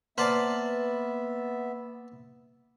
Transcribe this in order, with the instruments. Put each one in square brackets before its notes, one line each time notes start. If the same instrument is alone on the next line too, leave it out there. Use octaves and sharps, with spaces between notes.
[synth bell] A#3 B4 F#5 [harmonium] B3 E5 [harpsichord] C5 D5 A5